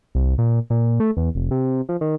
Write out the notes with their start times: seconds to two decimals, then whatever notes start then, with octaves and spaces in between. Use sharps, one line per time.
0.15 C2
0.38 A#2
0.70 A#2
1.00 A3
1.17 E2
1.35 F1
1.51 C3
1.89 F3
2.01 D#3